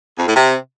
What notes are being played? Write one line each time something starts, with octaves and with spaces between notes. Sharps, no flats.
F2
A2
C3